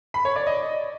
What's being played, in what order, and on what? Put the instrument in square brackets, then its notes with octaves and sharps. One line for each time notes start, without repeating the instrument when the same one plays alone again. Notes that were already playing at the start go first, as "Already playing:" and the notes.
[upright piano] B5
C#5
D5
D#5